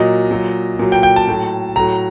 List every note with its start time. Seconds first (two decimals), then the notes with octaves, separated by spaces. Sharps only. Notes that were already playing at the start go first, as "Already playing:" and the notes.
Already playing: A#2 F#3 D#5
0.31 A#2 F#3
0.79 A#2 F#3
0.92 G5
1.03 G5
1.16 A5
1.27 A2 F#3
1.76 A2 F#3 A#5